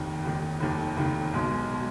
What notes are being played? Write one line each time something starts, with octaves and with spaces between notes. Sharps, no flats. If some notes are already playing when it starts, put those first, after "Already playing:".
Already playing: F1 D#2 D#3
F1 D#2 D#3
F1 D#2 D#3
F1 D#2 D#3
B1 B2 G#3
B2 G#3